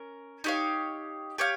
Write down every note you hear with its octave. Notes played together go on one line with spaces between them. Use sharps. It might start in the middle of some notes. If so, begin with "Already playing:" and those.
Already playing: C#4 A#4
D#4 G4 C#5 F5
G4 C#5 F5